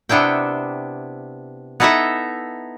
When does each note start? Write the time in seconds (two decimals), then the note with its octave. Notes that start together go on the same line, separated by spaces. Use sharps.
0.09 C3 B3 D4 E4 G5
1.80 B3 D#4 E4 A4 D#5 E5